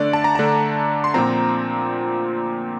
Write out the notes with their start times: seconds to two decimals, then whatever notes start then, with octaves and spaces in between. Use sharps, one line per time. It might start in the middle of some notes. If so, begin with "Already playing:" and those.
Already playing: D3 A3 D4 D5
0.13 A5
0.24 A#5
0.35 D3 A3 D4 A5
1.04 C6
1.14 A#2 F3 C4 A#5